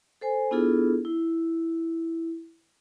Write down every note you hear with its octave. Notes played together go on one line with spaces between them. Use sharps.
A4 C5 G#5
B3 D4 E4 F4 G#4 A4
E4